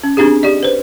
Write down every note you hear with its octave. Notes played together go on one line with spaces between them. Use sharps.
C#4
C4 D4 D#4 G4 G#4
G4 D5 D#5
B4 C5